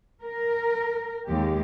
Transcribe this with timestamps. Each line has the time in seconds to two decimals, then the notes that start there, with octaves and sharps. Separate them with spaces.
0.21 A#4
1.27 D#2 G#3 G4